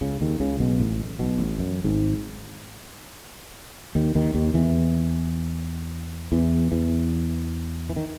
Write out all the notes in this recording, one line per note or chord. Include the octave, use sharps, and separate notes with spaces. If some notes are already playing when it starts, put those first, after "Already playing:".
C#2 C#3
D#2 D#3
C#2 C#3
B1 B2
A1 A2
B1 B2
A1 A2
F#2
G#1 G#2
D#2 D#3
D#2 D#3
D#2 D#3
E2 E3
E2 E3
E2 E3
E3
D#3